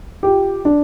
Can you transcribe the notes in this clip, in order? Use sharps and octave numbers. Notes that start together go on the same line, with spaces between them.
F4 G4
D4